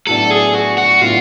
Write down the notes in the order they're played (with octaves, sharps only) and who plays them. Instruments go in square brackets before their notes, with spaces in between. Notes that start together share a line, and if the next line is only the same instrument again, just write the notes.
[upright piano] A2 F#3 B3 D4 [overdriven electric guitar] A4
[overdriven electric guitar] G#4
F#4
F#4
[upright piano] A2 F#3 B3 D4 [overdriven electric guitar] F4